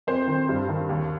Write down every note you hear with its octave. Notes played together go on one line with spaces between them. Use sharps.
F2 C5
D#3
G2
D#3
D#2